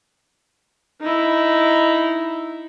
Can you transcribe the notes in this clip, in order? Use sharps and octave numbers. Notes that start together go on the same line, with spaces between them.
D#4 E4